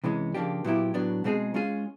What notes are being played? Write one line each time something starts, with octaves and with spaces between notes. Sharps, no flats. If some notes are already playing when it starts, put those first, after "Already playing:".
C3 E3 G#3 C#4
C#3 F3 A#3 D4 G4
A#2 F#3 B3 E4 G4
A2 F#3 B3 D4
B2 G#3 C4 D#4 G#4
G#3 C#4 F4 G#4